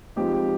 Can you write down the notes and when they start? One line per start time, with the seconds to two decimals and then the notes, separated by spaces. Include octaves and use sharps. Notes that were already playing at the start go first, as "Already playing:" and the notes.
0.16 F3 G#3 C4 D#4 G4
0.33 G4